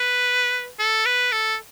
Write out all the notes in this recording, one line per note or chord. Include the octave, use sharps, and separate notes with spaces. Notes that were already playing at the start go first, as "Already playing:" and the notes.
Already playing: B4
A4
B4
A4